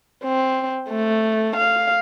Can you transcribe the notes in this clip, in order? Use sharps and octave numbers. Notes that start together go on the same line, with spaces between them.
C4
A3
F5